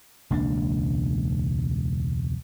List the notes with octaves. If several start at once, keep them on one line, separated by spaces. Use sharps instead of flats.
E1 C#2 A#3 D4